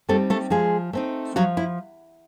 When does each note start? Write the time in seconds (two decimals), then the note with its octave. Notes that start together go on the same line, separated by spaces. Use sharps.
0.08 G3 A3 C4 D#4 A4
0.30 A3 A4
0.50 F3 G#3 G#4
0.93 A3 C4 D#4
1.36 F3 F#3 F#4
1.57 E4